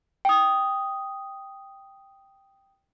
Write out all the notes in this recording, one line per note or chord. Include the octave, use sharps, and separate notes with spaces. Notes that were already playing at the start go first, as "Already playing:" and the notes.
G5 D#6